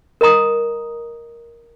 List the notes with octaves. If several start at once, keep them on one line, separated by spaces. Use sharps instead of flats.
A#4 D#5 A#5 D#6